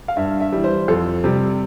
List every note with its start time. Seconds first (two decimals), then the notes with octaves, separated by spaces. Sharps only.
0.08 F5
0.17 G2 E5
0.40 E5
0.52 E3 G3
0.64 C5
0.88 F2 A4
1.24 C3 G3